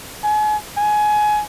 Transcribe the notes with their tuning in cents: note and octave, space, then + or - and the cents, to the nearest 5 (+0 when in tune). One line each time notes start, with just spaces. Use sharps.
G#5 +35
G#5 +20